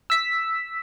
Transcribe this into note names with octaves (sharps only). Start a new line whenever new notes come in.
E6 B6